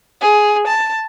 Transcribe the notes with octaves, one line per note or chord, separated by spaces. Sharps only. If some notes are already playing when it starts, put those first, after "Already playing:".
G#4
A5